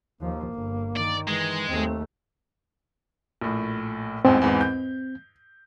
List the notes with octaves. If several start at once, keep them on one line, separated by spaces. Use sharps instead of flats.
D#2 F3 A#3
G1
D#3 D5
E3 G#3
D#2 A3 C4
A#1 A2
A1 E2 G#2 C4
E2 G#2 E3
G6